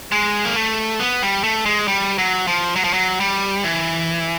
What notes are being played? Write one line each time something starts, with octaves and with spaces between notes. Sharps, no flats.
G#3
A#3
A3
B3
G3
A3
G#3
G3
F#3
F3
F#3
F3
F#3
G3
E3